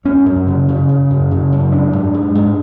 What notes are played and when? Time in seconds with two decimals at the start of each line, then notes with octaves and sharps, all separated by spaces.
0.05 F#2 C#4
0.26 F#2
0.47 C#3
0.68 C#3
0.89 C#3
1.10 F#2
1.31 C#3
1.52 F#2
1.72 G#2 D4
1.93 G#2
2.14 G#2
2.35 G#2